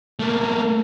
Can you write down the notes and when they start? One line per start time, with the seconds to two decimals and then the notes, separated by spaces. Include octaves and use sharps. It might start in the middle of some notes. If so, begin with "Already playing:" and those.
0.19 A3 A#3